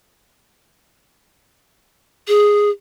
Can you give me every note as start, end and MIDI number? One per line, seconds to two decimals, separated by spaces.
2.28 2.70 68